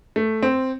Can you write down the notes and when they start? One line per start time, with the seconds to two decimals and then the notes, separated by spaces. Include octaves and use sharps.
0.16 A3
0.43 C4